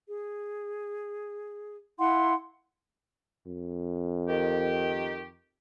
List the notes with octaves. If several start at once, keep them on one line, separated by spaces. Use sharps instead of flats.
G#4
E4 F5 F#5 C6
F2
D#3 G4